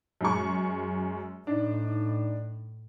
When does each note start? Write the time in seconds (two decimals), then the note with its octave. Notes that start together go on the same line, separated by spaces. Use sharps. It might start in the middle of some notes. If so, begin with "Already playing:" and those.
0.21 F#2 G#3 C#6
1.47 A2 D4 D#4